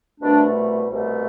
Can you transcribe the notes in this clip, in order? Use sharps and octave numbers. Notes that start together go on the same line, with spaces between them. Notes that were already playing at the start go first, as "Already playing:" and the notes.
C2 B2 A3 D4
C2 B2 A3